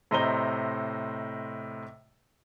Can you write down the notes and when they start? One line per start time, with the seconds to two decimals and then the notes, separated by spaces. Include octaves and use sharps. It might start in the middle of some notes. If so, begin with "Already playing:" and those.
0.11 A2 C3 C5 D#5 A#5 G7